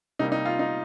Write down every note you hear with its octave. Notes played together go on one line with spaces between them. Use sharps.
C3 G3 A#3 D#4
D#4
F4
D#4